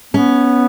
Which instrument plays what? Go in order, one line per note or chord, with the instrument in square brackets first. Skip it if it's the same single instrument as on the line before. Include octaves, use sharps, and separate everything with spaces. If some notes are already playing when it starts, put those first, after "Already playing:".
[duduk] B3 [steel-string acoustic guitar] C#4